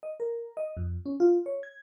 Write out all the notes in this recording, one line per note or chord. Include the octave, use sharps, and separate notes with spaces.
D#5
A#4
D#5
F2
C#4
F4
C#5
G#6